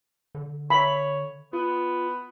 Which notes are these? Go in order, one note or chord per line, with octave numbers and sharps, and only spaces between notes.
D3
C#5 B5
B3 F4